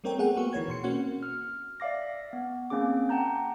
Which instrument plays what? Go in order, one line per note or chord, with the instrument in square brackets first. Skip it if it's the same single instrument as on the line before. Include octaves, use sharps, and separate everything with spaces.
[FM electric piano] G3 A3 C4 A#4 C#5 G5
A3 B3 G#4 F#5 G5
A#3 B3 F#4 C#6
D#3 E3 C#5 G#6
B2 C6 C#7
A#3 C4 C#4 F#4 F#5
[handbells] F6
D5 E5 F5 D6 A#6
B3
A#3 C4 C#4 G#4 D6
F#5 G5 A5 A#5 G6